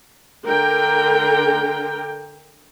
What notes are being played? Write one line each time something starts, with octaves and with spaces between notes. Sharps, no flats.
D3 A#4 G5